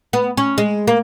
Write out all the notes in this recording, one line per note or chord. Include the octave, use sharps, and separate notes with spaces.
B3
C#4
G#3
A#3